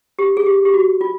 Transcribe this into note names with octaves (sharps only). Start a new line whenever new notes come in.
G4
G#4
G4
G4
F#4
F4